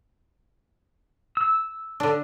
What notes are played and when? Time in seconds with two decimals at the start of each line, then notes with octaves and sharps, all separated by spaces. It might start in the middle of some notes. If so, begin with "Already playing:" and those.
1.37 E6
2.00 D3 D4